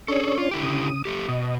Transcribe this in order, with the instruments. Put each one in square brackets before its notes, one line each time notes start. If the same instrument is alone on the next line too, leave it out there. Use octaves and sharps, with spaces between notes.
[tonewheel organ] C#4 D4 C#5 [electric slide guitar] G#4 A4
[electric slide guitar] F4
D3 E4 G4
[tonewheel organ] C#3 D#6
[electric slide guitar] A3 G4
[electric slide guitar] B2 [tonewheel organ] D#5